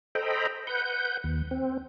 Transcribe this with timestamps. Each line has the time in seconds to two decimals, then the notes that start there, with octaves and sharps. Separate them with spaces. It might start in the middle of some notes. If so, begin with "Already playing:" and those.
0.15 A4 C5 D#5 G5 A#5 B5
0.67 B4 F#5 G6
1.24 D#2
1.51 C4